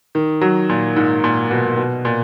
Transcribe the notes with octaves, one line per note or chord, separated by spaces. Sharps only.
D#3
F#3
A#2
G#2
A#2
B2
B2
A#2